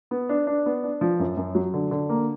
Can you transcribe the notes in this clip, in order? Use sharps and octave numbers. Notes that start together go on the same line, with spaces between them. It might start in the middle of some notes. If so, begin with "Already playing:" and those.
B3
D4
D4
B3
D4
F3
F#2
F#2
F#3
D3
D3
A#3